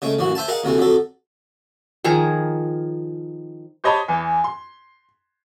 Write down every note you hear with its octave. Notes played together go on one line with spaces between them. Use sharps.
C#3 G#3 A3
A1 F#2 E3 F#4
C5 E5 G#5 A5
G#4 A#4 D#5 F5 F#5
D2 C3 E3 A3
F2 F#3 A4
D#3 F3 G#4 A#5
G4 C5 C#5 D#5 A5 B5
E2 E3
C6